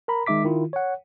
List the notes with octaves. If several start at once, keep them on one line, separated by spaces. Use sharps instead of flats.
A#4 A#5 B5
D#3 G#3 D#4 E5 D6 B6
D#3 E4 F4
C#5 F#5